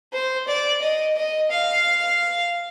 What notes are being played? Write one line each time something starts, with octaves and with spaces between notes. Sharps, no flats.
C5
D5
D#5
D#5
F5